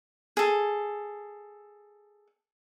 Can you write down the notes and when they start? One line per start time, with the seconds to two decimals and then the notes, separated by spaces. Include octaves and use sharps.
0.37 G#4 A4